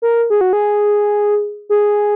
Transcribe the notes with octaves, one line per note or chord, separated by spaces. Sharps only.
A#4
G#4
F#4
G#4
G#4